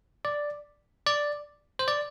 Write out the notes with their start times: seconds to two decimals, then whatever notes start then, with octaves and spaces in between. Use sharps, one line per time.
0.25 D5
1.06 D5
1.79 C5
1.88 D5